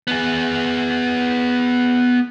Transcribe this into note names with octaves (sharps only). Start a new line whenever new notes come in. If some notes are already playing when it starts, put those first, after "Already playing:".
B3 G#4